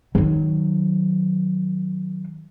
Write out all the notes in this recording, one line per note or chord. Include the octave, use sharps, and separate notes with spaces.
D#3 F#3